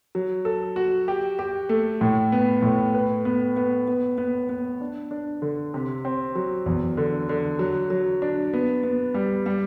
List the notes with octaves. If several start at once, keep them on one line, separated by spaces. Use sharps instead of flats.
F#3
A4
F#4
G4
G4
A3
A2
B3
A2
B4
B3
B3
B3
B3
B3
D4
D4
D3
C3
C4
F#3
E2
D3
D3
F#3
F#3
D4
B3
B3
G3
G3